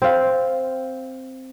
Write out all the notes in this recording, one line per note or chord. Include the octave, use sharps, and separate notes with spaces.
C4 F5